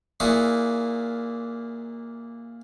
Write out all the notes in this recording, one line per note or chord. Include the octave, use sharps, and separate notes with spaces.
A#2 A#3 E4 F#4 G#4